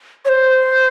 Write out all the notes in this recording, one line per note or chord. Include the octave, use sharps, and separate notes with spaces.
C#5
C5